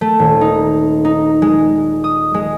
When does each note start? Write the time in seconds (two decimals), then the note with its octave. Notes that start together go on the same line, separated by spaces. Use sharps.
0.01 A3
0.19 D#1
0.41 D#4
1.05 D#4
1.42 G#3
2.04 D#6
2.34 G#3